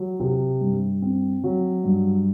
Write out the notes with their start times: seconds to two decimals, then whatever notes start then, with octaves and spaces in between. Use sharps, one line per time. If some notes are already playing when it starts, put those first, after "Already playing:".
Already playing: F#3
0.20 C3
0.61 G2
1.02 C4
1.44 F#3
1.84 G2